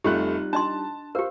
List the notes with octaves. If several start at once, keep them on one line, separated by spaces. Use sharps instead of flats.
F1 G3 A3 D#4 F4 G4 F#6
D4 D#5 A5 C6
G4 A#4 C5 F5